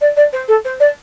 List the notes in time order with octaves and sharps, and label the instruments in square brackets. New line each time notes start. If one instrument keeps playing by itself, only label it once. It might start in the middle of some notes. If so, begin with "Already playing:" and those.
[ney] D5
D5
C5
A4
C5
D5